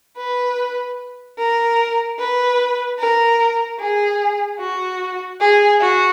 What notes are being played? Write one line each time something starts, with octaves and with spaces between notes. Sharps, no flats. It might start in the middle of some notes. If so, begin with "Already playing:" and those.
B4
A#4
B4
A#4
G#4
F#4
G#4
F#4